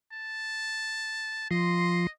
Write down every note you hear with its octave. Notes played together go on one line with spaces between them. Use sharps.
A5
F3 D#5 C6